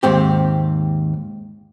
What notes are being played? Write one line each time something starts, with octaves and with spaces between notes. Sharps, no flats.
D#2 G#2 C4 G4